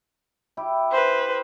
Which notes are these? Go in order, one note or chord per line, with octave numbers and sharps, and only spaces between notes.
E4 G4
B4 C5